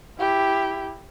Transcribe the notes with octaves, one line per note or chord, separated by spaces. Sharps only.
E4 G4